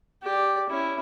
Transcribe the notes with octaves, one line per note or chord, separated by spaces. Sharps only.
G4 D5
C#4 E4